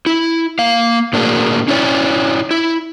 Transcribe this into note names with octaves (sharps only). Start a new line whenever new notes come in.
E4
A#3 F5
A2 A#3 D4 E4 F#4 G#4
C#4 D4 E4 C#5 D5 G#5
E4